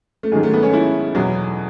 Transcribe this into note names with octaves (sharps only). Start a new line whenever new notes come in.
A3
G#2 D#3 F#3 G#3
A3
B3
C#4
E4
E2 B2 F#3